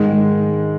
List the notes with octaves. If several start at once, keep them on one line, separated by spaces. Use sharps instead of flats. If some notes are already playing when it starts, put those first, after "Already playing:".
Already playing: G#2 D#3 G#3